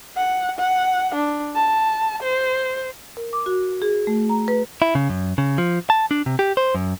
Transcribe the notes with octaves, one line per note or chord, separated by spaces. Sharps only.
F#5
F#5
D4
A5
C5
A#4
D6
F#4
G#4
A3
A#5
B4
E4
C#3
F#2
C#3
F3
A5
D4
C3
G4
C5
F#2